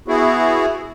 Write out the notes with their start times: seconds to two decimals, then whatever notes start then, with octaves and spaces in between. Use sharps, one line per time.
0.08 B3 E4 F#4 G#4